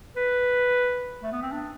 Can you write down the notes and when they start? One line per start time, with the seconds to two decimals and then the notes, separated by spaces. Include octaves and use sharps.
0.16 B4
1.23 A3
1.32 B3
1.42 C4
1.52 D4